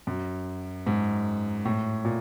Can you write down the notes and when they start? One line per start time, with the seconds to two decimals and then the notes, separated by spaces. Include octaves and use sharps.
0.07 F#2
0.87 G#2
1.65 A2
2.05 A#2